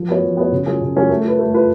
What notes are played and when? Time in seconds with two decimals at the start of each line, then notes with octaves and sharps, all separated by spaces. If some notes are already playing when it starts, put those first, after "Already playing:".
Already playing: F3
0.08 B3 F#4 C#5
0.23 F3
0.37 B3 F#4 C#5
0.52 C#3
0.66 F#3 C#4 F4 G#4
0.81 C#3
0.96 F#3 C#4 F4 G#4
1.09 A3
1.25 F4 B4
1.39 A3
1.54 F4 B4